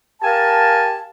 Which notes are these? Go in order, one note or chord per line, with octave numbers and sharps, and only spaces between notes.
G4 A#4 F5 G#5 A5